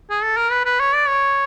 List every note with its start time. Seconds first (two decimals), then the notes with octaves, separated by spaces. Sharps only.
0.10 G#4
0.23 A4
0.37 A#4
0.51 B4
0.65 B4
0.80 C#5
0.94 D5
1.08 C#5